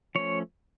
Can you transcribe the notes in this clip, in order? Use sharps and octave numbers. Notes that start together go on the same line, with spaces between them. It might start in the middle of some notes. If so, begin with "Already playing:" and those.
F3 A3 C#4 C#5